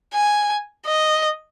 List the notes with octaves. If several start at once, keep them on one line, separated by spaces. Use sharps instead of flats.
G#5
D#5